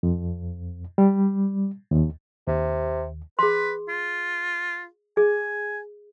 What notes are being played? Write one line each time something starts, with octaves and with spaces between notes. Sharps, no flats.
F2
G3
D#2
D#2 C3
G#4 B4 C6
F4
G#4 G#5